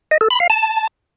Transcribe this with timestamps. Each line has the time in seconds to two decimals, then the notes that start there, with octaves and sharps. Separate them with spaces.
0.11 D#5
0.21 A4
0.31 B5
0.40 F5
0.50 A5